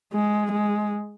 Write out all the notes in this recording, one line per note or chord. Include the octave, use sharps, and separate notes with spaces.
G#3
G#3